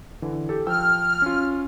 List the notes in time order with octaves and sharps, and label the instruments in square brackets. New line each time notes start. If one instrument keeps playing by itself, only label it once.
[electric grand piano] D3 E3
G4 A4
[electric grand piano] F3 G5 E6 [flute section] F6
[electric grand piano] C#4 F4